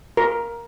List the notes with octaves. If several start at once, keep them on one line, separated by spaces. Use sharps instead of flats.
A#4